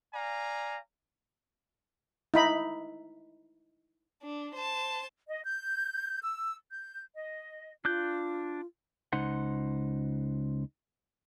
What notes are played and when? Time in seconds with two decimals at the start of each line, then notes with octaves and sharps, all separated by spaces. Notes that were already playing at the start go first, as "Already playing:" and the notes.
0.13 D5 F5 G#5 A#5
2.34 D#4 E4 B5
4.23 D4
4.55 C5 A5
5.29 D#5
5.45 G6
6.23 E6
6.71 G6
7.15 D#5
7.85 D4 F4 F#6 G6
9.13 C#2 D#4 C5 F#5